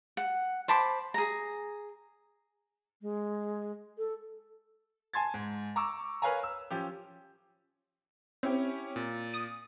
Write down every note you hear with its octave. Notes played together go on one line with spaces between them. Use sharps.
F#5
C5 A5 B5 D6
G#4 A#5
G#3
A4
G#5 A5 C6 G#6 A6
G#2
A#5 C#6 D6 E6
A#4 B4 C#5 F5 G#5 A#5
E6
F3 C#4 G4
C4 C#4 E4 G4
A#2
D#6